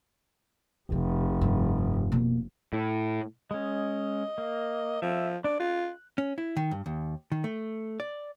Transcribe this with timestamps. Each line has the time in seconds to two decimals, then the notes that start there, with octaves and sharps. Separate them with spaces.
0.92 F1 C3
1.41 G2
2.12 B2 A#3
2.73 A2
3.51 G#3 C#4 D#5
4.38 A#3
5.02 F3 E5
5.44 D4 D5
5.60 F4 F#6
6.18 C#4
6.38 E4
6.57 D#3
6.71 G2
6.86 D#2
7.32 D#3
7.44 A3
8.00 D5